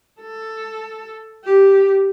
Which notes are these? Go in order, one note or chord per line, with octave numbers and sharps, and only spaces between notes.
A4
G4